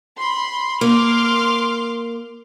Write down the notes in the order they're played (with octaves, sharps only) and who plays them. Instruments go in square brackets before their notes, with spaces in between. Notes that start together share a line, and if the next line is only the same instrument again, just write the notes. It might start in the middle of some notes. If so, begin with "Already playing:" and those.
[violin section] B5 C6
[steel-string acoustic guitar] A#3 [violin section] C6 D6 F6